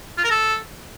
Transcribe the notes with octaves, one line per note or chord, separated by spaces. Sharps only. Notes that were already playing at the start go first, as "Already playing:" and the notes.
F4
A#4
A4